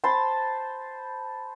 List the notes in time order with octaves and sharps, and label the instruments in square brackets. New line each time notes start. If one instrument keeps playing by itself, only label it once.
[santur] C5 A5 B5 C6